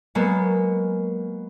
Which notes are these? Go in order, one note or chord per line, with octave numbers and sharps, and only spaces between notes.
F#3 G#3 A#3 B3